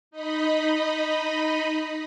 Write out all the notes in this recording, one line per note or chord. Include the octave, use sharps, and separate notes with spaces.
D#4 D#5 B5